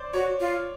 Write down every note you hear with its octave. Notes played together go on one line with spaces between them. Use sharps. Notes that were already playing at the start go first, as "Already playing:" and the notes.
Already playing: C5 D5
F#4 C#5
F4